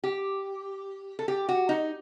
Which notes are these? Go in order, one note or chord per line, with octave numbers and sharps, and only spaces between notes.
G4
A4
G4
F#4
D#4